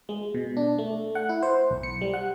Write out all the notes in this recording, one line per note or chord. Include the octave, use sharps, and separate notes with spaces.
G#3
B2
D4
A3
F#5
E4
C5
B1
C#7
G3
F#5